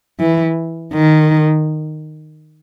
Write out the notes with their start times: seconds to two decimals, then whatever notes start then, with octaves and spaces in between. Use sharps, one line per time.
0.20 E3
0.93 D#3